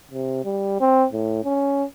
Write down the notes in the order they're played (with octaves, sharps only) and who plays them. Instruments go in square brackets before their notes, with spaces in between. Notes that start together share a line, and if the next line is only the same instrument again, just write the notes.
[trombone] C3
G3
C4
A2
C#4